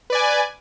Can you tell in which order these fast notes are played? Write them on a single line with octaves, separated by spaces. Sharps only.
B4 D5 G#5